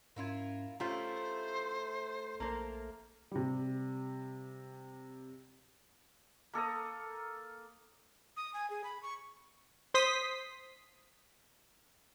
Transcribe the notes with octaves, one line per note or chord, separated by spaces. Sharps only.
G#2 A#3 C#4 E4 F4 G#6
A3 C#4 E4 F4 G4 C5 A#5 G6
A#1 A#3 A#4 C5 A5
C3 G3
A#3 A4 A#5 D#6
D#6
G#5
G#4
B5
C#6
C5 C6 D#6 B6